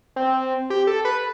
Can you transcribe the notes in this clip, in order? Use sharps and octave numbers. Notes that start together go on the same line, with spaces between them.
C4
G4
A4
B4